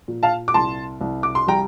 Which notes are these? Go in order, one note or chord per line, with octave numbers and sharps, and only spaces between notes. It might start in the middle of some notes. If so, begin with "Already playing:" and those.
A#2
F5 A5
D6
C2 A5 C6
C2
D6
C6
G3 G5 A#5